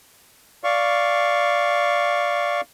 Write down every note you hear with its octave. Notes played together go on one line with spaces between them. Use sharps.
D5 F5 C#6